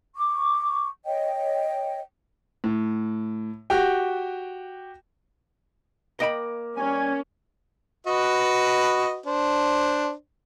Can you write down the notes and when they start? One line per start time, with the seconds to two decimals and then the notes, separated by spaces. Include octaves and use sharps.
0.16 C#6 D6
1.05 C#5 D#5 G5
2.64 A2
3.70 F#4 G4 G5
6.20 A#3 D#5 G5 B5
6.77 G3 C#4 G#5
8.07 F#4 B4 D#5
9.26 D4 C5